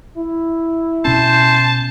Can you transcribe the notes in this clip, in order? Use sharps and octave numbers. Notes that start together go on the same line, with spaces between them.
E4
B2 C#4 C5 A5